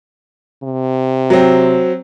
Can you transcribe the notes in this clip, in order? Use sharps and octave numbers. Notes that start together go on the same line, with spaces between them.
C3
F#3 C4